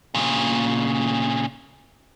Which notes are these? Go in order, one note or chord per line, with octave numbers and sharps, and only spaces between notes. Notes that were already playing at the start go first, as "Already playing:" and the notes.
A#2 C#3